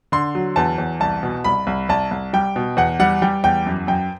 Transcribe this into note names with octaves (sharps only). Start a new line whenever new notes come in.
D3 C6
F#3
E2 A5
E2
C2 A5
B2
C2 B5
C2
C2 A5
C2
G3 G5
B2
E2 F#5
G3 F#5
G3 G5
E2 G5
F#2
F#2 G5